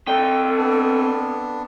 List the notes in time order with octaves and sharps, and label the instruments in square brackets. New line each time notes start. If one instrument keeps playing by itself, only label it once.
[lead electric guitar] C4 D#5 [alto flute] A4 [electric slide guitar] G5 [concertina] A#5
[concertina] B3 D4